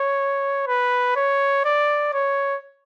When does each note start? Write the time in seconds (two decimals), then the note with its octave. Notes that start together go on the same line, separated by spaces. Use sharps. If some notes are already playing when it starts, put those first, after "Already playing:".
Already playing: C#5
0.67 B4
1.16 C#5
1.65 D5
2.14 C#5